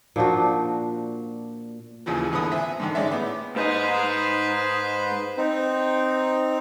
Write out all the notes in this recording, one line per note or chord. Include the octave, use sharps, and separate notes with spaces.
A#2 F3 D4 F#4
D#2 A#2 C#3 E3 F3
G#1 D3 E3 B3 B4 D#6
C4 E5 G#5
G#2 D3 D#3
G#3 C#4 D#4 D5 E5
A2 B3 D6
G#2 D#4 B4 C5
C4 D#4